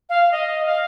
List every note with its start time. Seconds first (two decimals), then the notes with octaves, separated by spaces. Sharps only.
0.09 F5
0.32 D#5
0.65 F5